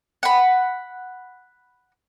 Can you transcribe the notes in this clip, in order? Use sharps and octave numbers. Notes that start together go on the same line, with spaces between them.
F#5 B5